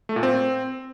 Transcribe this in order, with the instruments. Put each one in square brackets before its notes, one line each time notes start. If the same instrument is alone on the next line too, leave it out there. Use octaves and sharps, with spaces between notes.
[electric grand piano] A3
A#2
C4